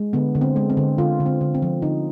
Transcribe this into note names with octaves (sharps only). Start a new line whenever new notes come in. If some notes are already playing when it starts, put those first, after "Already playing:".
Already playing: G#3
D3 B3
D3
C4
G#3
C4
D3
D3 F4
D3
C4
D3
C4
F3
D3 D#4